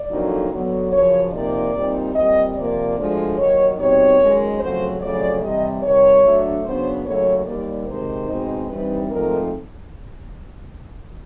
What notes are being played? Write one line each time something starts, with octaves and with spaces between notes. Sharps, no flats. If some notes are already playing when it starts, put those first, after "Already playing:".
Already playing: D5
F2 D3 F#3 A#3 D#4
D3 F#3 B3
F#2 C#3 F3 C#5
C3 F3 A#3 D#4 D5
A#2 G3 C4 D#4
A#2 G3 C4 D#5
C3 F3 A#3 D5
D2 D3 F3 G#3
D#2 D#3 F#3 C#5
B2 G3 C4 D#4 C#5
F#2 D#3 G#3 C#4
F2 C#3 F#3 A3 C5
F2 C#3 F#3 A3 D5
C3 E3 G3 C4 D#5
C3 D#3 G3 C#5
D3 F#3 A3 D4
C#3 F#3 B3 D4 C5
D#2 C#3 F#3 A3 C#5
D#2 D#3 G3 A#3 D5
C3 D#3 G#3 C5
B2 G#3 C4 D#4
G2 E3 G3 C4 D#4 B4
G#2 F3 A3 C4 D#4 A#4